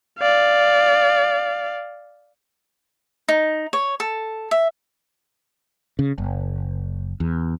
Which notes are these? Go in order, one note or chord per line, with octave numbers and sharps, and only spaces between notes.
D5 F5
D#4
C#5
A4
E5
C#3
F#1
E2